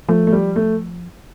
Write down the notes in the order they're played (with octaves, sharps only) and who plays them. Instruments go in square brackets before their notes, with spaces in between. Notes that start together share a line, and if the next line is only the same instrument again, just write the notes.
[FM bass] F3 [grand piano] A3
[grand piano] A3
G3
A3